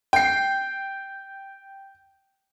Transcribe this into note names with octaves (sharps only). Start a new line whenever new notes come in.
G5 C7